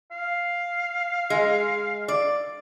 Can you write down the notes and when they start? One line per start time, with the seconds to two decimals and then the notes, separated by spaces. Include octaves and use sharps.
0.11 F5
1.30 G#3
2.08 D5